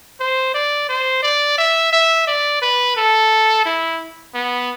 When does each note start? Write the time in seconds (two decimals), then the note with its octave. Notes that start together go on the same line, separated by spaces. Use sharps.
0.20 C5
0.54 D5
0.89 C5
1.23 D5
1.58 E5
1.93 E5
2.27 D5
2.62 B4
2.97 A4
3.66 E4
4.35 B3